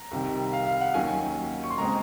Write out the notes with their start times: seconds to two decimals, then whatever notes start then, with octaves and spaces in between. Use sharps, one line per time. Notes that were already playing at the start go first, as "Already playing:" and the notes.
Already playing: A#5
0.11 C2 C3 D#3
0.53 F5
0.67 F5
0.81 F#5
0.94 D#2 D#3 F#3 C#4 G#5
1.64 C#6
1.70 C6
1.78 C#2 C#3 G#3 C4 A#5